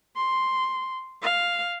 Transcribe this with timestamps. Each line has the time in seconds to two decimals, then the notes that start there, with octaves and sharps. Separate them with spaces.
0.16 C6
1.22 F5